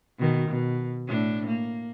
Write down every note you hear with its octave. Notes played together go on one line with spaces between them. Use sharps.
B2 D#3
B2
A2 D4
A#3